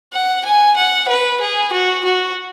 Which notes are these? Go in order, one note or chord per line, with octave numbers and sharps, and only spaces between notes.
F#5
G#5
F#5
B4
G#4
F#4
F#4